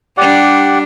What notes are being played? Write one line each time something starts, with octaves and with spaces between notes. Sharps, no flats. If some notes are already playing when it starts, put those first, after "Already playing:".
G3 D4 G4 D5 F#5